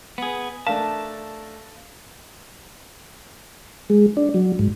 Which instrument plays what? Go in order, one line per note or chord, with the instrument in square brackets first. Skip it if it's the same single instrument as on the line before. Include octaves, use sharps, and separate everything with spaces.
[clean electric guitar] B3 G#4
[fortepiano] A3 D4 A#4 [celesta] F5 [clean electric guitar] A5
[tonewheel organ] G#3
D4
F#3
G#2